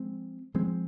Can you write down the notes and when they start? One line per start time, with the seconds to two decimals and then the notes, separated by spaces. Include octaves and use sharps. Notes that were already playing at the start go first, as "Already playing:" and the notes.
Already playing: F3 G#3 C4
0.54 F3 G#3 C4